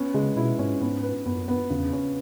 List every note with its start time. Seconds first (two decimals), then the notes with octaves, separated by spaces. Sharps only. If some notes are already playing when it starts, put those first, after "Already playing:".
Already playing: B3 C#4
0.14 C#3 G#3
0.36 B2 E4
0.59 G#2 C#4
0.81 G#2 B3
1.03 B4
1.25 F#2 B3
1.48 B3
1.70 E2 C#3
1.93 C#4